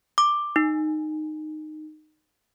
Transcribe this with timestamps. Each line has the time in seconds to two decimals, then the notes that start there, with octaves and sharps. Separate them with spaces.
0.18 D6
0.56 D#4